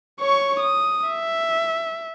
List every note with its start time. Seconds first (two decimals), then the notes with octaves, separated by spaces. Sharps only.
0.20 C#5 C#6
0.60 D#6
1.09 E5